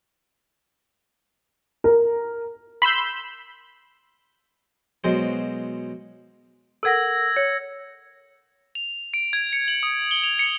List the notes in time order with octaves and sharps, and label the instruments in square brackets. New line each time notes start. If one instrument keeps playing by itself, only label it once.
[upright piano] A#4
[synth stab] B5 C6 E6 G6
[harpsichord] B2 F#3 G#3 C5
[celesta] A4 A#4 F#5 [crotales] E6 G#6 A#6
[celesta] C#5 [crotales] C#7
[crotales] F7
D7
G#6
C#7
F#7
D#6
G7
F7
C#7